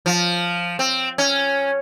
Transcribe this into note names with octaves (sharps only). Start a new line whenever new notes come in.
F3
C4
C#4